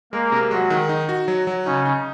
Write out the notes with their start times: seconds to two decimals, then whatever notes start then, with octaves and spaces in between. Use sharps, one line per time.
0.13 G#3 A#3 A#4
0.32 C3
0.51 F#3 G#3 F#4
0.70 D#3
0.89 D#4
1.09 F#4
1.28 F#3
1.47 F#3
1.66 C#3 C#4 D#4
1.85 D#4